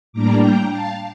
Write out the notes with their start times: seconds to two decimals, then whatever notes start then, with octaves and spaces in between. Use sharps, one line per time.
0.13 A2 G3 A#3 D4 A#5 D6
0.41 G5 A#5
0.69 F5 A5